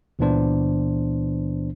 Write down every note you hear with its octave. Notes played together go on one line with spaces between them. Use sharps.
C#2 A#2 E3 B3 D4 C5